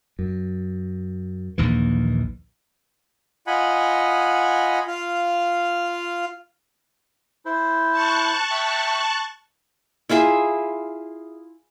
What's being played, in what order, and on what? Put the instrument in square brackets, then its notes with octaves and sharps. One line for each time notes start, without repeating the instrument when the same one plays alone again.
[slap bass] F#2
A#1 D#2 E3
[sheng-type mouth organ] F4 D#5 F#5 G#5 B5
F4 F5
[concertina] E4 C5
[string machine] A5 C#6 F#6
[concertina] E5 G5
[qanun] E4 F4 G#4 E5